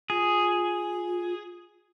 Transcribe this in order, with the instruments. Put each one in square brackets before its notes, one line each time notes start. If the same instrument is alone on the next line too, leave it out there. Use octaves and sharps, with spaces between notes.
[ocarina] F4 [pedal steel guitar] G#4